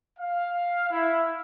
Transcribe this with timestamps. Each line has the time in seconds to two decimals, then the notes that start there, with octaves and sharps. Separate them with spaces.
0.19 F5
0.90 E4